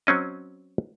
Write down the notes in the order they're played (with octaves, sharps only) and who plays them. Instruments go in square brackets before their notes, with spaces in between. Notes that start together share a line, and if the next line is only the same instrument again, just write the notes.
[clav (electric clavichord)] F#3 C4 C#4 D#5